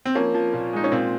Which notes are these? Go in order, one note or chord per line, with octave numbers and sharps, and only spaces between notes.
C4
F3 A#3 C#4
F3
A#2
G#3 D#4
C#4
A#2 C4